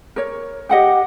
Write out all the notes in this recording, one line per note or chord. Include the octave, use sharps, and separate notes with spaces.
A#4 C#5
G4 D#5 F#5 G5